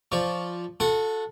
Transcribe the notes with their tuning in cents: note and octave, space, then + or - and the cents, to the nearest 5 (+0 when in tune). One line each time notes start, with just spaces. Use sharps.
F3 +0 D5 +0 C#6 +0
F#4 -35 A4 +0 F#5 +0